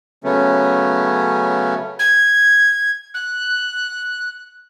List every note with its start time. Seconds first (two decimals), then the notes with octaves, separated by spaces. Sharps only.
0.24 C#3 F#3 A3 B3 C#4
1.99 G#6
3.14 F#6